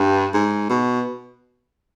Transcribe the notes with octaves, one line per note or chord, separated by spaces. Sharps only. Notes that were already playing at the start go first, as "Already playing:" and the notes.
Already playing: G2
G#2
B2